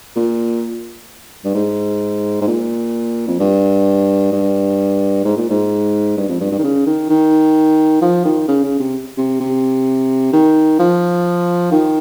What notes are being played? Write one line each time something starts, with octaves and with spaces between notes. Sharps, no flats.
A#2
G2
G#2
G#2
A#2
F2
G2
G2
G#2
A#2
G#2
G2
F2
G2
G2
D#3
C#3
D#3
D#3
F3
D#3
C#3
C#3
C3
C3
C3
D#3
F3
D#3